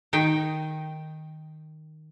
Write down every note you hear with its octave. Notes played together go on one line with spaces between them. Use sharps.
D#3 D#4 G5